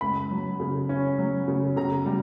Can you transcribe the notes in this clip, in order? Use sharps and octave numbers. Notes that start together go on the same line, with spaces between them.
C#2 B5
F#3
C#3
C#4
F#3
C#3
C#3 A#5
G3